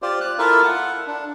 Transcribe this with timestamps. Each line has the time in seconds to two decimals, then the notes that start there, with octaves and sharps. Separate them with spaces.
0.02 F4 G4 C5 D5
0.21 F#6
0.39 E4 F4 A4 A#4 E5 F5
0.64 F#5
1.07 D4